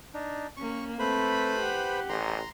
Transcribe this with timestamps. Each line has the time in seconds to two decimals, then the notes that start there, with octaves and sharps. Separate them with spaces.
0.14 D4 D#4
0.57 A#3 C#4 C#6
0.99 A3 C4 B4 C5 B5
1.59 G4 F#5
2.09 A1 A#5 C6